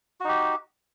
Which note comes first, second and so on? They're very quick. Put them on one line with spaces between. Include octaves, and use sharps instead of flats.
F#4 D#4 G4